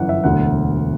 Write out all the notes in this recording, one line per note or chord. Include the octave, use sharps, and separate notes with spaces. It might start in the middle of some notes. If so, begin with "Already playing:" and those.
Already playing: G1 F#2 E3 F#5
E5
E1 D2 D3 F#3 F#5